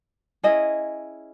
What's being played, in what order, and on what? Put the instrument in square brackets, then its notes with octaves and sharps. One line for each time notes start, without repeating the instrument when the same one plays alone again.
[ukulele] C#4 E4 G#4 D#5